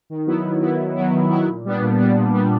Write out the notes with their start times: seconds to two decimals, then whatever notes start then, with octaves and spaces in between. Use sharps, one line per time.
0.10 D#3
0.26 F#3 B3 E4
0.44 D#3
0.61 F#3 B3 E4
0.79 D#3
0.95 F#3 B3 E4
1.13 D#3
1.30 F#3 B3 E4
1.47 A#2
1.65 G3 B3 D4
1.82 A#2
1.99 G3 B3 D4
2.17 A#2
2.34 G3 B3 D4